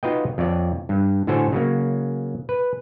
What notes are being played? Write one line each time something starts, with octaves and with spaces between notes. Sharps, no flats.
D#4 F4 F#4 B4 D#5 G5
F2 C#5 D5
G2
A2 D3 F#4 A4 C5 G#5
C#3 F#3 A#3
B4